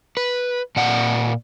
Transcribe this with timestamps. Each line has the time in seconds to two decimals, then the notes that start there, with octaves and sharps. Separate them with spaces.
0.17 B4
0.76 A#2 D5 F#5